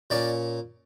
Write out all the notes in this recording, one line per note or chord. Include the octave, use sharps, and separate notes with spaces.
A#2 A#3 C#4 D5